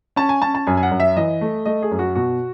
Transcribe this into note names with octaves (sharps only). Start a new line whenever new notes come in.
C#4 A5
G#5
C#4 A5
A5
F#2 G#5
G#5
F#5
F#2
E5
E3 D#5
A3
A3 D#5
G#4
F#2
F#4
B2 F#4